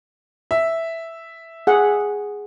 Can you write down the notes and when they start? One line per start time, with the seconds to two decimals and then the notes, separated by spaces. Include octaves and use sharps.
0.51 E5
1.67 G#4 F#5